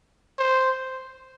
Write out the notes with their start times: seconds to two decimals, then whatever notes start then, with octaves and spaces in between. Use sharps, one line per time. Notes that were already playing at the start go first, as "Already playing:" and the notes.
0.39 C5